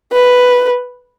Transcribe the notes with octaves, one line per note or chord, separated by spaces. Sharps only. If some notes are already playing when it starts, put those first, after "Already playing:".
B4